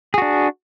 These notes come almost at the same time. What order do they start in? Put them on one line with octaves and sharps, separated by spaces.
G#4 F#4 D4